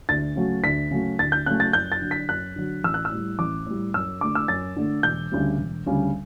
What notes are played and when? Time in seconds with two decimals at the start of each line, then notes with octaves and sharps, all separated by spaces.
0.09 D2 A6
0.36 C#3 F#3 A3
0.63 D2 B6
0.91 C#3 F#3 A3
1.19 D2 A6
1.32 G6
1.46 C#3 F#3 A3 F#6
1.60 A6
1.73 F#2 G6
1.92 A6
2.02 D3 F#3
2.11 B6
2.29 F#2 F#6
2.56 D3 F#3
2.84 A1 E6
2.94 F#6
3.05 E6
3.11 A2 G3
3.39 A1 D6
3.66 A2 G3
3.94 F#2 E6
4.21 D3 A3 D6
4.35 E6
4.48 F#2 A6
4.77 D3 A3
5.03 E1 G6
5.32 D2 C#3 G3
5.58 E1
5.86 D2 C#3 G3